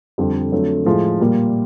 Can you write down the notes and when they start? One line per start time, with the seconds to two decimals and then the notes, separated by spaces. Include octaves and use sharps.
0.18 F2 D3 G3
0.52 F2 D3 F#3 A3
0.86 A2 F3 G#3
1.20 A#2 G3 A#3